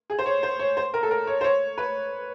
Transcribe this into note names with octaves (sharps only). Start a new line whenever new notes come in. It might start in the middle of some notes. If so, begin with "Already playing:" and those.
G#4
C5
C#5
C5
C#5
C5
A#4
A4
A#4
C#5
C5
C#5
B4